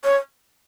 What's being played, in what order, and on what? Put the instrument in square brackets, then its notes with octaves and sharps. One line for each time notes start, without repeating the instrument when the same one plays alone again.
[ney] C#5